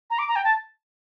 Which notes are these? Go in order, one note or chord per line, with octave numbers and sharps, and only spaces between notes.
A#5
D6
A#5
G5
A5